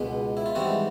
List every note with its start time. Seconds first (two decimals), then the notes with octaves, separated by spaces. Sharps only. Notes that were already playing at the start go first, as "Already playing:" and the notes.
Already playing: C#2 B2 G#3 B4
0.37 E4
0.46 F4
0.55 G#2 E3 G3 C4 F#4